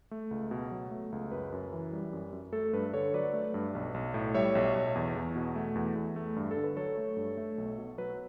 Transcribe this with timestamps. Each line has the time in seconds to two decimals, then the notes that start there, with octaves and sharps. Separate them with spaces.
0.11 A3
0.31 C#2
0.51 B2
0.71 F#3
0.91 A3
1.12 C#2
1.31 F#2 B4
1.52 F#2
1.73 E3
1.93 G3
2.13 F#2
2.33 F#2
2.52 A3 A4
2.73 G2 B4
2.94 D3 A4 C#5
3.14 F#3 B4 D5
3.33 A3
3.54 G2
3.75 B1
3.94 B1
4.14 A2
4.35 G3 C#5 E5
4.55 B1
4.75 B1
4.95 E2
5.16 E2
5.36 B2
5.56 A3
5.75 E2
5.95 E2
6.16 A3
6.36 G2
6.51 A4
6.57 D3
6.64 B4
6.77 F#3 A4 C#5
6.97 A3
7.17 G2
7.37 A3
7.58 B1
7.78 B2
7.98 F#3 B4